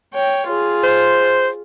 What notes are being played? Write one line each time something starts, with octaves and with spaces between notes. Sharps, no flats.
C#5 G5
F4 G#4
C5